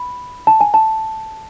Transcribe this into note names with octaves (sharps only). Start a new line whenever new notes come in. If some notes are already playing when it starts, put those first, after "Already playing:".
Already playing: B5
A5
G#5
A5